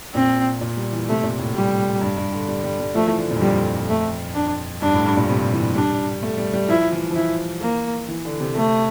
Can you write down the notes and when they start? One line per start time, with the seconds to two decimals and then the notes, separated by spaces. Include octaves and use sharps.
0.15 A#2 C4
0.61 A#2
0.77 G3
0.93 E3
1.09 C3 A3
1.23 A#2
1.39 A2
1.55 G3
2.01 G2
2.17 G2
2.33 D3
2.49 G3
2.64 G3
2.80 G3
2.95 F3 A3
3.07 E3
3.19 D3
3.31 A#2
3.37 G2
3.41 F2 G3
3.89 A3
4.35 D4
4.82 G2 D4
4.93 A2
5.05 G2
5.17 A#2
5.29 C3
5.52 E3
5.75 G3 D4
6.23 A3
6.38 G3
6.53 G3
6.68 F3 E4
6.92 E3
7.10 F3
7.15 E3 E4
7.62 A#3
8.08 E3
8.25 D3
8.40 C3
8.56 C3 A3